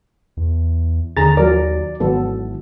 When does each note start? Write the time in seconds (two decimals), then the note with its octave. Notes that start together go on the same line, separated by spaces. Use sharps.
0.37 E2
1.17 D#2 D3 G#4 A#5 A6
1.37 F3 F#3 A#4 D5
2.00 G#1 E3 F#3 B3 A4